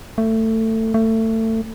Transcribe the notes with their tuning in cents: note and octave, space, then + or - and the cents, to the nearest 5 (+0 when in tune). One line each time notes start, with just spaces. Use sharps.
A3 +20
A3 +25